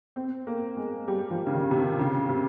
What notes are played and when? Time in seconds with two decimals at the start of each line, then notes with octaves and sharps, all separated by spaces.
0.16 C4
0.47 A#3
0.77 G#3
1.08 G3
1.30 F3
1.47 C#3
1.54 D#3
1.71 C3
1.77 C#3
1.99 C#3
2.29 C3